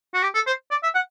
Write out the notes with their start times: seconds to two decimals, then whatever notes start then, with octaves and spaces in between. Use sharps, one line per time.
0.14 F#4
0.22 G4
0.34 A4
0.47 C5
0.71 D5
0.83 E5
0.95 F#5